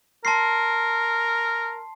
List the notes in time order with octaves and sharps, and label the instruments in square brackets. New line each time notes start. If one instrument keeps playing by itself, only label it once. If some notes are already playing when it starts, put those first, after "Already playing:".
[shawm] A#4 [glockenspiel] A5 C6 C7